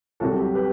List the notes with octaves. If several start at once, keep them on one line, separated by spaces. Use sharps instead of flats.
C2 C3 F#3 F#4 A4
G4
G4 B4